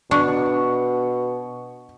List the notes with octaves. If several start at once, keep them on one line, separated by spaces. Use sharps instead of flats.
B2 D4 C#6